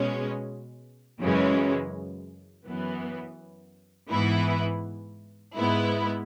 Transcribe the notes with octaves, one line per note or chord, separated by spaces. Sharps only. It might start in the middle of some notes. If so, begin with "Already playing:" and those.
Already playing: B2 G#3 C#4
F#2 C#3 E3 G#3 C#4
F#2 E3 B3
G#2 E3 B3 E4
G#2 G#3 B3 E4